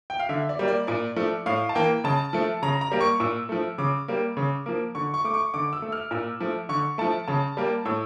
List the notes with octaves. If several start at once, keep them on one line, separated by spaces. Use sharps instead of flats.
G5
F5
D3 E5
D5
G3 A#3
D5
A#2 D5
F3 A3
A2 F5
A5
E3 A#3 G5
C#3 A5
F3 A3
C#3 A#5
A#5
G3 A#3
C#6
A#2 E6
F3 A3
C#3 D6
G3 A#3
C#3
F3 A#3
D3 C#6
C#6
A3 D6
C#6
D3 D6
E6
A3
F6
A#2 E6
F3 A3
D3 C#6
F3 A3 A5
C#3 A5
G3 A#3
A2 E6